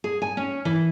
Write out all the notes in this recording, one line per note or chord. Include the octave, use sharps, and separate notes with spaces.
G#4
G#5
C#4
E3